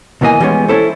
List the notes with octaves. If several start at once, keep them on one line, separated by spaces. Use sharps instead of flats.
C#2 B2 E3 A#3 D#5 G#5
E3 G3 G#3 B3 C#4
C#4 E4 A4 C5